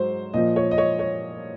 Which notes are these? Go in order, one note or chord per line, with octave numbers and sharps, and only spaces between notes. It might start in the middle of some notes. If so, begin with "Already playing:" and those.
Already playing: G#2 F#3 C5
A#2 F3 D#5
C#5
D#5
C#5
C#5